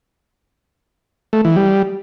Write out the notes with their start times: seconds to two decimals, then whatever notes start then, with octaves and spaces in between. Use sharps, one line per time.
1.33 A3
1.45 E3
1.56 G3